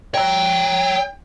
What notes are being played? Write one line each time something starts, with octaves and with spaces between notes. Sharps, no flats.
C#5 G5 A#5